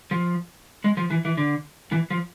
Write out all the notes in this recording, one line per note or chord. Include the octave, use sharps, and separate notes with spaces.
F3
G#3
F3
E3
E3
D3
E3
F3